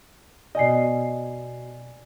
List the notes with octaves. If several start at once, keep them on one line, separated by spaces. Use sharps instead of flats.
B2 D5 D#5 G#5 C7